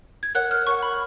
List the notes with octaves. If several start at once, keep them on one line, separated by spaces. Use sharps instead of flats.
G#6
A#4 C#5 F#5 F#6
F6
A#4 C#5 F#5 C#6
B5